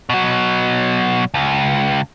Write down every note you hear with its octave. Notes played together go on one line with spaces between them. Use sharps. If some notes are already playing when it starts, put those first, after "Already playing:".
B2 F#3
C#2